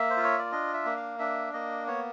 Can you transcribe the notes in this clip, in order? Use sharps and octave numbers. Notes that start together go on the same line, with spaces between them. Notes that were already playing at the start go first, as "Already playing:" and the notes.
Already playing: A#3 E5
C5
F4
C#5
D5
D4 D#5
E5
A#3
F5
D4 E5
A#3 D#5
B3 C#5